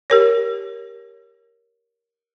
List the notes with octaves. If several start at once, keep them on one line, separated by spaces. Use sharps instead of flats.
G4 A#4 C#5